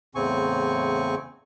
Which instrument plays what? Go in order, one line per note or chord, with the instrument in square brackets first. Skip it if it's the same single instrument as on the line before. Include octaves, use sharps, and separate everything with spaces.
[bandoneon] E2 A2 C#3 C4 G#5 C#6